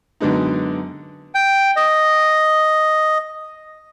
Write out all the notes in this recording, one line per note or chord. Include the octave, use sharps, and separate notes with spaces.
F#2 D3 G#3 B3 D#4
G5
D#5